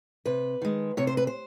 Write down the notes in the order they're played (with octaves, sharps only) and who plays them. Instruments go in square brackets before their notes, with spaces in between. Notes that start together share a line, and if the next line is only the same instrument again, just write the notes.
[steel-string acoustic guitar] C3 B4
D#3 G#3
C3 C#5
C5
B4
C5